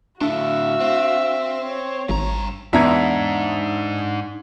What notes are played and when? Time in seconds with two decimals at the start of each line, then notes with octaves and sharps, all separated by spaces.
0.21 A2 D3 D4 F#4 E5 F5
0.80 C4
1.64 C#5
2.09 G#1 G2 A#5
2.73 E2 G#2 D4 E5 A#5 G#6